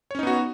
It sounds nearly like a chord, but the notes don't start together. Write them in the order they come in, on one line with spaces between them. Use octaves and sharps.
C#5 C#4 D#4 B3 F#4